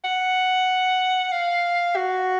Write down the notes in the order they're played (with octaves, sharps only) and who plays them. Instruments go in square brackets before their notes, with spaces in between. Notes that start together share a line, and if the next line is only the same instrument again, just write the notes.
[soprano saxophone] F#5
F5
F#4